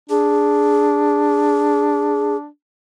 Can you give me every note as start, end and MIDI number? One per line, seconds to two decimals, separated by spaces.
0.10 2.47 62
0.10 2.36 68